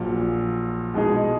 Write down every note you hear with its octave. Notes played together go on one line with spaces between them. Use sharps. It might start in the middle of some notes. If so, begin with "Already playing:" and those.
Already playing: A#1 A#2 F#3
B2 G#3 D#4 G#4